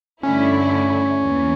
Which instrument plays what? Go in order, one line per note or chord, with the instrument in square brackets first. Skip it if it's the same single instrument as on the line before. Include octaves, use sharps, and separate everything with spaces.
[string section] G2 D3 A3 E4 [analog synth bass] C#4
[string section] E2 E3 A#3